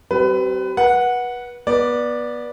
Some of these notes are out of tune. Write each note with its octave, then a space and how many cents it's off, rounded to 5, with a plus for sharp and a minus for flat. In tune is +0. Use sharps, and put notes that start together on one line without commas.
G3 -40 C4 +0 B4 +25
B4 -25 F#5 -5
B3 -25 D5 +0